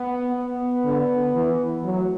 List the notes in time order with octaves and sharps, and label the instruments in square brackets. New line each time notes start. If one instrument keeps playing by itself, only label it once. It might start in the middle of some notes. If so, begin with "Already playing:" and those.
Already playing: [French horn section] B3
B3
[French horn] D3
E3
[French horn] F#3 [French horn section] A3